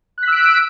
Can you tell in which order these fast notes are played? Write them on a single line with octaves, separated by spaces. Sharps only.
F#6 B6 E6 D7